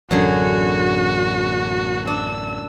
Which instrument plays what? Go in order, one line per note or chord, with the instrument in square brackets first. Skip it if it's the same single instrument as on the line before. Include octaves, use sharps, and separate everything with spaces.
[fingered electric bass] A1 F#3 [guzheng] F#2 D3 G#4 [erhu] F#4
[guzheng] D4 [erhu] E6